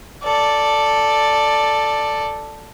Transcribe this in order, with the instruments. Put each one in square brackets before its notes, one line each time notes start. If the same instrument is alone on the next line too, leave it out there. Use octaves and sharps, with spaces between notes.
[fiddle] A4 D5